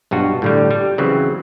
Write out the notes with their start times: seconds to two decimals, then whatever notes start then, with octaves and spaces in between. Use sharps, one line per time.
0.11 B1 G2 F4 F#4
0.42 A2 D3 G3
0.71 G3
0.98 C#3 E3 F#3 C4